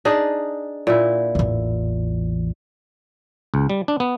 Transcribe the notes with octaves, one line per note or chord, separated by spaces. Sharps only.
D4 D#4 G#4
A#2 E4
A1 E2
C#2
G3
D4
B3